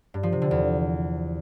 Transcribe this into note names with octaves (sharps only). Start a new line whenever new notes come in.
G2
F3
C3
D3
E2